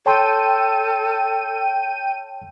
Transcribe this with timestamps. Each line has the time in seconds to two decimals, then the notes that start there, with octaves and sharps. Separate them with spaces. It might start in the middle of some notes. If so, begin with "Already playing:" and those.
0.06 A4 C#5 G5 A5 C6 D#7